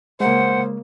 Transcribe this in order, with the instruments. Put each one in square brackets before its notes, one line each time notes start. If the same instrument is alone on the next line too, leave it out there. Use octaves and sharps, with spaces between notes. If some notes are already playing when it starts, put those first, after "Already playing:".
[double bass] C#3 A#3 [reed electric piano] G#3 [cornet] C5 [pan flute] F#5